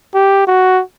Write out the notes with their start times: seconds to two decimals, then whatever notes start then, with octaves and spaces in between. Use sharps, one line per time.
0.14 G4
0.47 F#4